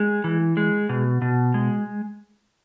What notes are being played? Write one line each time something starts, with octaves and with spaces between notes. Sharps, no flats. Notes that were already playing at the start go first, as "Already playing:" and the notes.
Already playing: G#3
E3
G#3
B2
B2
G#3